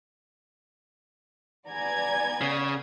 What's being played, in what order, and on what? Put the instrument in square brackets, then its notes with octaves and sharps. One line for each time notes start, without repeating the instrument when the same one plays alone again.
[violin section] B3 D5 G#6 [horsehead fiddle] G#5 A#5
[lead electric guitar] C#3